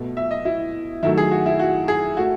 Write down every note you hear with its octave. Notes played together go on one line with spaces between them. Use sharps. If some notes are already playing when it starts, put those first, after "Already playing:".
Already playing: B2 A3
E5
D#5
E4
D#3 F#3 A3 E4
G#4
F#4
E4
F#4
G#4
A3 F#4